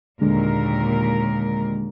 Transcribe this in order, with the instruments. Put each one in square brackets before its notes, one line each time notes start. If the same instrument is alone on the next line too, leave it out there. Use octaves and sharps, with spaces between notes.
[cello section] D#2 A#2 A#4 [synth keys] D3 G#3 D4